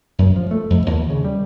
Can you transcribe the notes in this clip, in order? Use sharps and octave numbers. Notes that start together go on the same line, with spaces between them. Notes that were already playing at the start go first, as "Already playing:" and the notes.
F#2
F3
A3
F2
D#2
C#3
G3